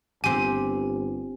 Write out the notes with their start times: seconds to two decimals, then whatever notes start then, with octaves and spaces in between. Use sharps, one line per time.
0.24 G1 C4 G4 G#5